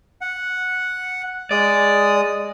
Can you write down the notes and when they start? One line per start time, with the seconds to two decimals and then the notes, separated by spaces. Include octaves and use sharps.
0.21 F#5
1.51 G#3 D5 D#6